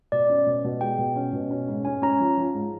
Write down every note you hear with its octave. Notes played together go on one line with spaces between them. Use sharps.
B2 D5
C#4
B2
B2
G#3 G5
B2
C#4
B2
C#4
G#2
C#4 G#5
C#4 A#5
F3
F3
G#2